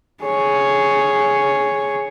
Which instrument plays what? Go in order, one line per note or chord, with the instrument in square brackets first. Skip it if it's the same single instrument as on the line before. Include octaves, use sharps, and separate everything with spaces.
[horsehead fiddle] G#4 C#5